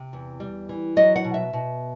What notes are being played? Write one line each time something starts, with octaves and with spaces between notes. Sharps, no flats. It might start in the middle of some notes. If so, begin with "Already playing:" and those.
Already playing: C3
E2
G3
E3
F#3 D#5
F#5
B2
E5
B2